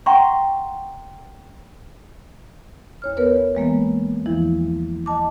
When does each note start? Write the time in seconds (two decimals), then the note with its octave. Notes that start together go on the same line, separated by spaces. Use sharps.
0.06 E5 F#5 G5 A#5 C6 C#6
3.02 E2 C#5 F6
3.17 B3 A#4 B4 C#5
3.55 E3 G#3 A#3 B3
4.26 E2 E3 F3 E4
5.06 D#5 A5 D6